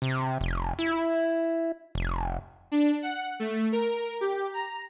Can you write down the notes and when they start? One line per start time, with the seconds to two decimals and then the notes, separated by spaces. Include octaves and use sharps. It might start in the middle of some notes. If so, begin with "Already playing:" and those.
0.02 C3
0.41 F1
0.79 E4
1.95 F1
2.72 D4
3.02 F#5
3.39 A3
3.72 A#4
4.21 G4
4.54 A#5